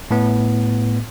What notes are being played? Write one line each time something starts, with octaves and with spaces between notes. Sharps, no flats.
A2 B3